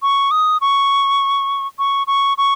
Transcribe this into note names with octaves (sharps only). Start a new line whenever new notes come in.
C#6
D#6
C#6
C#6
C#6
C#6